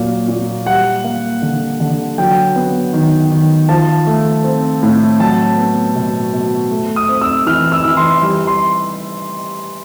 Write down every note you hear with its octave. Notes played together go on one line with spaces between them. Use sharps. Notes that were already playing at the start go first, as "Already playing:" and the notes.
Already playing: A#2 F#3 A#3
A#2
G3 F#5
A#3
D3
D3
F#3 G5
B3
D#3
D#3
F3 A5
A3
C4
A2
F#3 A5
B3
B2
B2
A3
D#6
C4
E6
E3 F6
E6
E3
C6
G3
C6